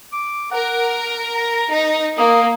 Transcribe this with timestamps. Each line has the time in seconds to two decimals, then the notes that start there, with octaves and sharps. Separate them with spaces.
0.13 D6
0.51 A#4 F#5
1.35 A#5
1.70 D#4
2.18 A#3 D#6